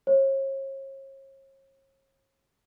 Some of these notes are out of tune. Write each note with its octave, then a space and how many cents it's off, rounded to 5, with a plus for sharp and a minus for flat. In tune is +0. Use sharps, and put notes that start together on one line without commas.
C#5 -40